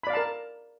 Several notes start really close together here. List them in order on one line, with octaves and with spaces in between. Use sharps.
B5 D5 F5 A5 A#4